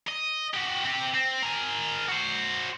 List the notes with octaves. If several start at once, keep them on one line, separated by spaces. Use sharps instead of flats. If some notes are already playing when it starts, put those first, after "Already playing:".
D#5
F#4 G4
C4 G4
C4
G#4 A#4
F#4 C5